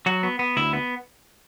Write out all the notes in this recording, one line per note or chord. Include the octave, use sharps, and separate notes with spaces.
F#3 F#4
B3
B3
D2 E4
B3